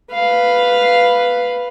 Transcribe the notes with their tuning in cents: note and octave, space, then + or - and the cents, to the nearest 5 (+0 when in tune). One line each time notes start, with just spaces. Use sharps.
B4 +0 F5 +0